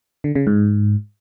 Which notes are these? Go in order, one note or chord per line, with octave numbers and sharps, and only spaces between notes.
D3
C#3
G#2